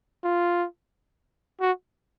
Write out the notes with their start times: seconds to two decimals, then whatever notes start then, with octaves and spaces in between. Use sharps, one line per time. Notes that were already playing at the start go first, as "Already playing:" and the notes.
0.24 F4
1.61 F#4